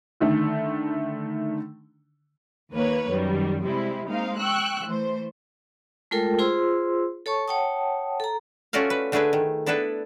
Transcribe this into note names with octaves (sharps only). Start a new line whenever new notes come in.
D3 D#3 A3
D#2 D#3 A#3 B4 C#5
F#2 D#3 G3
C3 G3 G#3 C4 E4
G#3 A#3 C4 D#4 F5
G5 C#6 E6 F#6
E3 A3 C5
G#3 A3 F4 A4 A#4 G5
F4 G#4 C5 C6 E6
A4 C#5 A5 C#6
C#5 F#5 G5 A5 D#6
A4 A#5
A3 C#4 F4 F#4 D5 F5
B4
D3 A3 D4 G#4 B4 D#5
D#3
B3 D4 E4 A4 B4